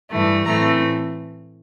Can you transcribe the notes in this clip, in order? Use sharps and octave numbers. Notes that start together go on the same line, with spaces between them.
G2 E3 A3
A2 E3 A3 C4 A#5